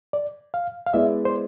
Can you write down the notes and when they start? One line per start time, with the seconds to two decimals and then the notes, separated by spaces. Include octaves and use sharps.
0.13 D5
0.54 F5
0.86 F5
0.94 G#3 B3 E4 B4 D5 E5
1.25 C5